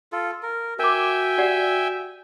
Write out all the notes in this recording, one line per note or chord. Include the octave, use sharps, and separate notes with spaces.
F4 A4
A#4
F#4 A#4 E5 G5 G#5 D6
G4 D5 F#5